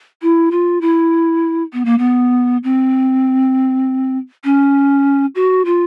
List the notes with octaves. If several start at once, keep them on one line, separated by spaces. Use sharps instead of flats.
E4
F4
E4
B3
A#3
B3
C4
C#4
F#4
F4